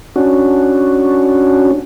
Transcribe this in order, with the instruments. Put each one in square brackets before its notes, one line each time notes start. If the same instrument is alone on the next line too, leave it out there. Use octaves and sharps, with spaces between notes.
[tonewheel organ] C#4 D4 F#4